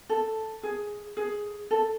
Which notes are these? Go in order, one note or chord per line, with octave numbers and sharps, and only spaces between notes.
A4
G#4
G#4
A4